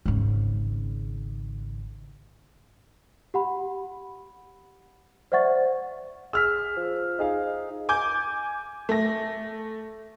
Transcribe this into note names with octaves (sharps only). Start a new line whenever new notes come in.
G#1 C#3
G4 F#5 B5
C5 D5 E5 F#5 C#6 A6
G#4 E6 F6 B6
F3
D#4 G#4 F5
G#5 D6 G6
A3 A#6